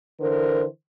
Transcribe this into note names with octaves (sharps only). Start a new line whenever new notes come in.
D3 E3 A#4 C5